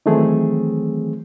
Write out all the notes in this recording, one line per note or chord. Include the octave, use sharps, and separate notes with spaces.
D#3 E3 F#3 A3 C4 G#4